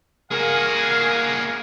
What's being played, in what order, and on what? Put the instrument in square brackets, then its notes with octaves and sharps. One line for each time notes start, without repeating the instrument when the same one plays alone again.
[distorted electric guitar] A#3 F#4 [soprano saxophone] G#4 [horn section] A#4 F5 G#5